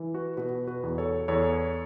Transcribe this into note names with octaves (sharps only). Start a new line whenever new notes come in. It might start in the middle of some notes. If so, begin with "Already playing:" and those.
Already playing: E3
F#4 B4
B2 F#4 B4
F#4 B4
E2
A4 C#5
E2 A4 C#5